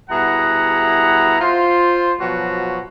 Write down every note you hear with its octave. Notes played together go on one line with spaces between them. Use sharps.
B2 G3 E4 G#4 F#5 A#5
F4 C5
B2 F3 F#3 F#4